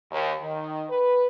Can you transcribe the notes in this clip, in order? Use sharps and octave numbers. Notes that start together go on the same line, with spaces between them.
D#2
D#3
B4